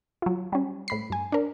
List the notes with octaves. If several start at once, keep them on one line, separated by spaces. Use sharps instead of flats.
F#3 F4
G3 C#4
A2 B5 C7
G2 G#5
D4 A#4